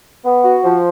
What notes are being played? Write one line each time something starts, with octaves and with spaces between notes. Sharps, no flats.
B3
F#4
F3